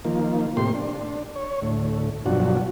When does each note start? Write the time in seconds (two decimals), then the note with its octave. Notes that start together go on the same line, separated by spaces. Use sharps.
0.05 D#3 F3 A#3
0.57 A2 C3 A#3 G4 C6
0.74 D4
1.36 C#5
1.62 D2 A2
2.26 G2 B2 F3 F#3 D4 F#4